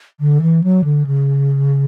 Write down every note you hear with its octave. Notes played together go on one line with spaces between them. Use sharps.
D3
E3
F#3
D3
C#3